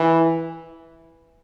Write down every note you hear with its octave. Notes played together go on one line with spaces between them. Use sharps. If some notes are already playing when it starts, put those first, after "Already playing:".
Already playing: E3